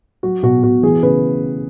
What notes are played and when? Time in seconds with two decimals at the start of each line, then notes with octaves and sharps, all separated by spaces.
0.23 F#3 F#4
0.43 B2 F#4
0.63 B2 F#4
0.83 E3 G#4
1.03 C#3 B4